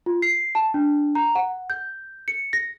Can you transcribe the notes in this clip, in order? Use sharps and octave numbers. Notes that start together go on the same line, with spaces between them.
F4
C7
A5
D4
A#5
F#5
G6
C#7
A#6